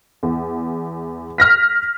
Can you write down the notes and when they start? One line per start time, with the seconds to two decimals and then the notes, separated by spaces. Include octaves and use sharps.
0.23 E2
1.38 F6 A#6 B6